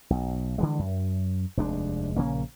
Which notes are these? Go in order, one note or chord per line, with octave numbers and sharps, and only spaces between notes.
B1
D3 E3 G#3
F#2
F1 D#2 G#3 D4
A#1 C#3 A#3 C#4